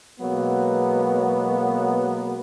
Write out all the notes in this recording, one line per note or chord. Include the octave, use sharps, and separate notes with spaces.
B2 F#3 G#3 A#3 B3